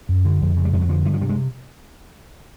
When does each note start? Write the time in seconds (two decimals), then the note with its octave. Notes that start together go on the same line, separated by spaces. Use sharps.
0.09 F#2
0.25 D3
0.41 F2
0.57 C#3
0.65 G3
0.73 F2 G#3
0.81 F#3
0.89 D3 F3
1.05 G2 E3
1.13 F3
1.21 C3 G3
1.29 G#3